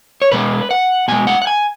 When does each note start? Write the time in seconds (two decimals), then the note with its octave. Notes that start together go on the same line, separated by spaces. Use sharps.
0.22 C#5
0.32 B2 G#3 B4
0.71 F#5
1.08 B2 G#3 G#5
1.27 F#5
1.42 F#5
1.47 G#5